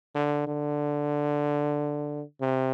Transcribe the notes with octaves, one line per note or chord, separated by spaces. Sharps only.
D3
D3
C3